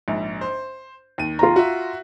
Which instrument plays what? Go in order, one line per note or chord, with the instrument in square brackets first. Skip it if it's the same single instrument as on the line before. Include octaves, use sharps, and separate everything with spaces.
[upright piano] A#1 G#2
C5
D#2 D#7
[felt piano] F4 A#5
[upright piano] F#4 E5